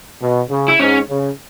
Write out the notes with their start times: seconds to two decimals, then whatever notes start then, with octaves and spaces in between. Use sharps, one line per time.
0.22 B2
0.50 C#3
0.68 E4
0.79 G#2 C#4
1.09 C#3